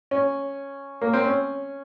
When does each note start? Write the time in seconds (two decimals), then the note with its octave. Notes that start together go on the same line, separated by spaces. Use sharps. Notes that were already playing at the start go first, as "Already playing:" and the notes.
0.11 C#4
1.01 A#3
1.13 C4
1.24 C#4